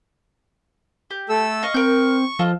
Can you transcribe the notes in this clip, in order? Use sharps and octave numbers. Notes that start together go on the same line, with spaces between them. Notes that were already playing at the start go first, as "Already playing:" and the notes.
G4
A3 A4 E6
D#5 F5 C#6
C4 A#4 G6
F3 F4 A4 D#5